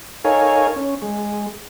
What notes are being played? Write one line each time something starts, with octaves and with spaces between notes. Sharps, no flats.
D#4 A4 A#4 C#5 F5 G#5
C#4
G#3